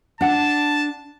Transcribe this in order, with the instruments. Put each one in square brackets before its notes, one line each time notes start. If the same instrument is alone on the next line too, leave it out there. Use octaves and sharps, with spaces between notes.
[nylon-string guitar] D4 F#5 [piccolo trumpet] A5